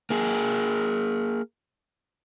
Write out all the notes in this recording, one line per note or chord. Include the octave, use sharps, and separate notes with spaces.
A#3 G#4